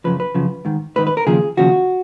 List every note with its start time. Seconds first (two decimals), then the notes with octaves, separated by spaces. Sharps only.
0.04 F#2 C#3 F3 B4
0.20 B4
0.35 F#2 C#3 F3
0.65 G#2 D#3
0.96 G#2 D#3 B4
1.07 B4
1.17 A#4
1.26 D#2 C#3 F3 G#4
1.57 D#2 C#3 F3 F#4